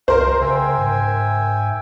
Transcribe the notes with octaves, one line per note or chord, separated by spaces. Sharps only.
C2 A#4 C5 F5
C#3 E5 G5 G#5
G#2